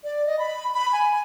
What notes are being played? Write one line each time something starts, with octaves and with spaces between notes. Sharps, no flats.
D5
D#5
B5
B5
G#5